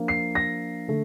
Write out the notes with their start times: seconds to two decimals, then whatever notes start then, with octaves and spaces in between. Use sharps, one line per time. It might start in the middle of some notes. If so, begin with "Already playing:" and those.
Already playing: F3 A#3 D4
0.08 C7
0.35 A#6
0.88 D3 A3